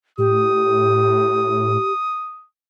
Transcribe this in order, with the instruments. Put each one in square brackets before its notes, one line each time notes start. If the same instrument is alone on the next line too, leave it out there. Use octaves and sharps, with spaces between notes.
[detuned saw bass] A2 [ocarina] G4 [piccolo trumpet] D#6